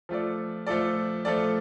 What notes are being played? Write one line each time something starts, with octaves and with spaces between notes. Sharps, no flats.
F3 A3 F4 A4 D5
F3 A3 F4 A4 D5
F3 A3 F4 A4 D5